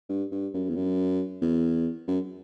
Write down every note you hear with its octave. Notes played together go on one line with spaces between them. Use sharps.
G2
G2
F#2
E2
F#2
E2
F#2